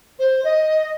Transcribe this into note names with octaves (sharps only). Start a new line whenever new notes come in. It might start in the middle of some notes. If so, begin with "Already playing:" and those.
C5
D#5